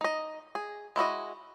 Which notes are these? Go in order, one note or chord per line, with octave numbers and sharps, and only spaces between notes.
D#4 D#5
G#4
G#3 E4 F#4 D#5